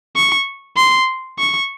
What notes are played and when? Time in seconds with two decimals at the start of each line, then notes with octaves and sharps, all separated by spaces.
0.16 C#6
0.77 C6
1.38 C#6